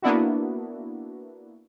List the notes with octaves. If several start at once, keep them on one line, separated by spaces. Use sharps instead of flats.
A#3 B3 D4 E4 F#4